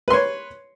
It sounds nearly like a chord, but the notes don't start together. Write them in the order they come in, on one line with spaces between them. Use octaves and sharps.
B4 C6 C#5